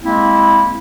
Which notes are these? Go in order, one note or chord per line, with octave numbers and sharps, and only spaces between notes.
G#3 A#3 C4 E4